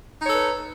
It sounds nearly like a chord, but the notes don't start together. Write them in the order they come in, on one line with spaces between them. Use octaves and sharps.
D#4 C#5 A4 B4